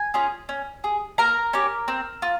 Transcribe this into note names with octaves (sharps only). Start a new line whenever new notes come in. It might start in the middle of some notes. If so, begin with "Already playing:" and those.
Already playing: G#5
C#4 F4 G#4
C#4
G#4
A#3 A#4 A#5
C#4 G4
C4
F4